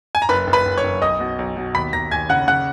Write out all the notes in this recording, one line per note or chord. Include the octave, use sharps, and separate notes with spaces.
G#5
A#5
F#1 B4 B5
F#1
B4 B5
F#1
C#5 C#6
F#1
B1 D#5 D#6
B2
B1
B2
D#2 B5 B6
D#2 A#5 A#6
D#2 G#5 G#6
C#3 F#5 F#6
C#3 F#5 F#6